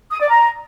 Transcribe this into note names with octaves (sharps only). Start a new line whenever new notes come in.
D#6
D5
A#5